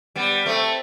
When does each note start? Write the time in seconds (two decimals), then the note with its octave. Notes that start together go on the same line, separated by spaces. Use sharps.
0.16 G3 B3
0.45 A3 C4